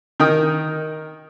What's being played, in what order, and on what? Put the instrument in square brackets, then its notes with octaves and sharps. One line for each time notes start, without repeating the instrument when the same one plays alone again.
[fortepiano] D#3 D#4 A#4 G5 D#6